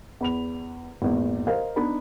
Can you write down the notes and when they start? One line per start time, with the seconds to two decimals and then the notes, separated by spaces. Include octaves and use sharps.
0.21 E2 B5 F7
1.02 G#1 E2 A#2
1.47 A#4 C5 D#5 F5
1.76 B3 D4 D#4 B5